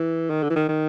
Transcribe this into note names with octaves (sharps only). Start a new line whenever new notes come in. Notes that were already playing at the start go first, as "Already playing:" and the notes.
Already playing: E3
D#3
D3
E3
D#3
D#3